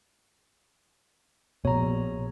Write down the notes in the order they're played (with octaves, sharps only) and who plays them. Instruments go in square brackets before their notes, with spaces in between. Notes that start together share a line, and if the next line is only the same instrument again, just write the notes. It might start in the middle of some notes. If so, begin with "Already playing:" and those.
[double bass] A#1 [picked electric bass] B2 [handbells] C#5 A#5